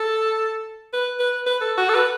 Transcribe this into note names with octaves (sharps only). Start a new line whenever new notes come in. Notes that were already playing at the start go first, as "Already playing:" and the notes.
Already playing: A4
B4
B4
B4
A4
F#4
A4
B4